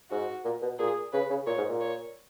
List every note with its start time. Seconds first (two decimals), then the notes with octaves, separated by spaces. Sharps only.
0.11 G#2 F#4
0.45 A#2
0.62 B2
0.79 A#2 G#4
1.13 C#3 B4
1.30 C#3
1.47 A#2 C#5
1.58 G#2
1.69 A#2
1.81 C#5